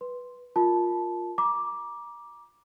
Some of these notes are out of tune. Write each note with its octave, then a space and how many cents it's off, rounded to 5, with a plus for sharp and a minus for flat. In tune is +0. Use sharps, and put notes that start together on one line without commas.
B4 +0 C6 +0
F4 +15 A#4 +0 A5 -15
A#5 +30 D6 +0